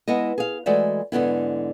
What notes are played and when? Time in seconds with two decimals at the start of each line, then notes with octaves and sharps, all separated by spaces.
0.08 G#3 B3 E4 D#5
0.38 G#4 F5
0.66 E3 G#3 A3 F#4 D5 E5
1.12 G#2 D3 B3 E4